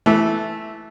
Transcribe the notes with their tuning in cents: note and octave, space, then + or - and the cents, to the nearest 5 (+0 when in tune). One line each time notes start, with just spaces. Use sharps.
E3 +0 A3 -15